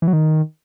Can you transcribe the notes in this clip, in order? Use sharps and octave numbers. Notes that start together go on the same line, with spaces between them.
E3
F#3
D#3